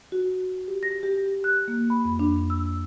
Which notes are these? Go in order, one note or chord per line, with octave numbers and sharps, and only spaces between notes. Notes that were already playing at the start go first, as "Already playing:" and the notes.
F#4
G4
A#6
G4
F#6
A#3
B5
F2
D4
E6